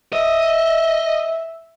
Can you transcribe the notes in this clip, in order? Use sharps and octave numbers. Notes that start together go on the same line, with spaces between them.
D#5 E5